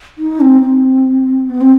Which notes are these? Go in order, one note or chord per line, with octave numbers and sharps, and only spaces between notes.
D#4
C4
C4
B3
C4